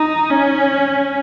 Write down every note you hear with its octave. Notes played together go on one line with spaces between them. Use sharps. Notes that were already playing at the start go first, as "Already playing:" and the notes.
Already playing: D#4
C#4